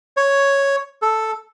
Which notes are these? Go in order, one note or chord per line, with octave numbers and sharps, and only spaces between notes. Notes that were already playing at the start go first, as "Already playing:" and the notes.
C#5
A4